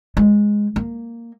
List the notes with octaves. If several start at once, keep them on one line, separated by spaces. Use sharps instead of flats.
G#3
A#3